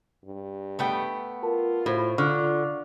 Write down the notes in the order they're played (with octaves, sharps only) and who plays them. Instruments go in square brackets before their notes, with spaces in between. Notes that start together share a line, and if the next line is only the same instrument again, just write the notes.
[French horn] G2
[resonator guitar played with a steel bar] A3 B3 G5
[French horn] F4 [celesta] A#4 A5
[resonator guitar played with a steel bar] A2 [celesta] F#4 C5
[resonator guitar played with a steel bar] D3 [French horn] F4 [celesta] C#6 F6